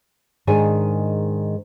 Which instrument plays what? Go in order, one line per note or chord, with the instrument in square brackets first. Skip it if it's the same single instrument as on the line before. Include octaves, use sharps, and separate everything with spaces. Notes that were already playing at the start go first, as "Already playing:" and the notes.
[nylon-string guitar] G#2 D#3 D4 G#4 A#4 G#5